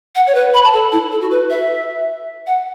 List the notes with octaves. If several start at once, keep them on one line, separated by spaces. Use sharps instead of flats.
F#5
C#5
B4
B5
A5
A4
E4
A4
F#4
B4
E5
F#5